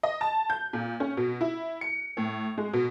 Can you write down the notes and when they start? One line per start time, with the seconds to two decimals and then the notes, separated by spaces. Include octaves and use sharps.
0.03 D#5
0.21 A5
0.50 G6
0.73 A#2
1.00 C#4
1.17 B2
1.41 E4
1.81 C#7
2.17 A2
2.58 G#3
2.73 B2